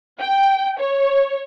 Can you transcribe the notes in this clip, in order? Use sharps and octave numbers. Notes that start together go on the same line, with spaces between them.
G5
C#5